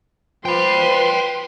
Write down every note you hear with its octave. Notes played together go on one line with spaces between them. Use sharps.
F3 B4 G5 B5 C6